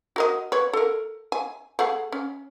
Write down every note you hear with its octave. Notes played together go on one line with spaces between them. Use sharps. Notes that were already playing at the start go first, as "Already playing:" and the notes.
F#4 A#4 D#5
B4 C#5
A4 A#4
G#5
A3 G#4 F#5
C#4